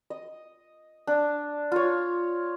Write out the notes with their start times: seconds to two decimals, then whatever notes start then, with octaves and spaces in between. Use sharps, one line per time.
0.10 D#5
1.07 D4
1.72 F4 C#5